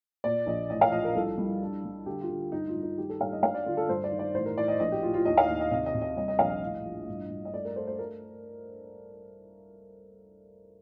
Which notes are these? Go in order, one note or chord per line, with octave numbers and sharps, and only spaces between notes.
A#2 D5
A#1 D#5
A1 D#5
F5
F3 D#5
A#4
C2 A4
G3
D4
G3
D3 G4
F4
D3
G2 D#4
F4
G2
D#4
D#3 G4
A4
G2 F5
D#5
D4 F5
D5
D3 F4
A4
G2 C5
D5
D#3
D5
A1 C5
A#4
A2 D5
D#5
A#1 D#5
G4
A2 F4
F4
D#2 D#5
F5
D#2 D#5
D#5
C3 D#5
D#5
C3
D#5
G3 D#5
D#5
A#1 F5
D#5
A2
F3
G2
G2
D#5
A3 D5
A#4
A3 C5
C5
A#4